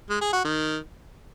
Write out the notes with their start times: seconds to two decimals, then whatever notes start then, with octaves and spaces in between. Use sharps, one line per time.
0.10 G#3
0.21 G#4
0.33 F#4
0.45 D#3